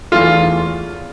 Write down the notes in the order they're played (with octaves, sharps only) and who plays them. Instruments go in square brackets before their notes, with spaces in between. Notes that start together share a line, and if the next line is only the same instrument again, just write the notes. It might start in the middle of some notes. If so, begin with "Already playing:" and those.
[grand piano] E2 E3 A3 F4